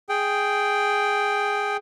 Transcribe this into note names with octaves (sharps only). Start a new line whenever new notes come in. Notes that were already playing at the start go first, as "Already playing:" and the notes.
G#4 G5